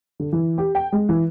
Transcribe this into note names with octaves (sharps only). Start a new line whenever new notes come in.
D3
E3
G4
G5
G#3
E3